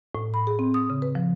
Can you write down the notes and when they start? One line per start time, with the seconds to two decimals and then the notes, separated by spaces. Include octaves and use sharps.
0.15 A2
0.34 B5
0.47 G#4
0.59 C4
0.74 D#6
0.90 C#3
1.02 B4
1.15 F3